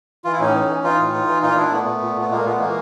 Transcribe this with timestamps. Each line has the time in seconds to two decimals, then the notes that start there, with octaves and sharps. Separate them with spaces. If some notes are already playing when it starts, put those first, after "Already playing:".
0.24 E3 F4
0.33 E4
0.40 A2 C#4 D#4
0.55 E3
0.69 E3
0.84 E3 D#4 F4
0.99 A2
1.13 E3
1.28 E3
1.42 A#2 D#4 F4
1.57 A#2 D4 E4
1.72 A#2 A3 B3
1.87 A#2
2.01 A#2
2.16 A#2
2.21 B3
2.30 A#2 G#3 A#3
2.45 A#2 A3 B3
2.59 E3 G#3 A#3